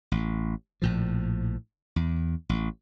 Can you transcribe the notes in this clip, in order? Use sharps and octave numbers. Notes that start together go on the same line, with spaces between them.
A1
A#1 A2 F3
E2
A1